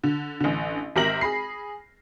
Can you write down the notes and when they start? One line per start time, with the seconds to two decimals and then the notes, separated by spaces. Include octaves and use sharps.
0.04 D3
0.40 A1 D3
0.96 G#1 G4 A#4 E5 A#6 F#7
1.21 G#4 B5 C7